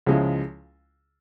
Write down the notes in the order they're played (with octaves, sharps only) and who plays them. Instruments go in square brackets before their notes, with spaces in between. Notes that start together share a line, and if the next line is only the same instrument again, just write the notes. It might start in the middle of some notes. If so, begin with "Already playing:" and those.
[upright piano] C#2 C#3 F3 G#3 E4